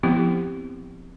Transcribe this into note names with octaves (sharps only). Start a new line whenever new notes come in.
F3 B3 C4 E4 G4